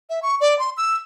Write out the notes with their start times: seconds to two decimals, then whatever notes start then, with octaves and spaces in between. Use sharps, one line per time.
0.10 E5
0.23 C#6
0.41 D5
0.59 C6
0.77 E6